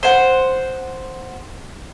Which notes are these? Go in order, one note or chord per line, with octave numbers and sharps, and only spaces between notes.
C5 F#5